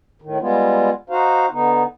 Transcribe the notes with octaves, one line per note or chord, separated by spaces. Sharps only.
A2 D#3
G3 G#3 B3 F4
D#4 F#4 C5 F5
D3 B3 D#4